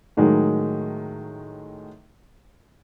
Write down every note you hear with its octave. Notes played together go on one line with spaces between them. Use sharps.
A2 D#3 F#3 G#3